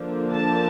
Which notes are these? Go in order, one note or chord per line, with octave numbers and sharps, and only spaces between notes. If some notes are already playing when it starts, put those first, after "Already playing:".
Already playing: D3 F3 A#3 D4
A5